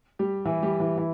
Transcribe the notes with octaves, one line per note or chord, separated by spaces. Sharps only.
G3 G4
E3 E4
G3 G4
E3 E4
E3 E4